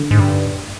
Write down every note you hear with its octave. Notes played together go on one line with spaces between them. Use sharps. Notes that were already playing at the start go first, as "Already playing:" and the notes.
Already playing: D3
G#2
G2